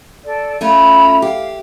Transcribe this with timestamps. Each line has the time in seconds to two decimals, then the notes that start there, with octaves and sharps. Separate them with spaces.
0.24 A4 D5
0.61 A3 C#4 F4 A#5 B5
1.22 G4 F5